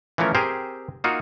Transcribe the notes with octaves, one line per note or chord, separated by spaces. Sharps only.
E3 F3 A3 C#4 A#4
C4 G4 G#4 A#4 C5
A#3 D#4 F4 F#4